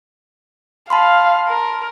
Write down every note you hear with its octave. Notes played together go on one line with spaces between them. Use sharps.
F5 A5 B5 C6
A#4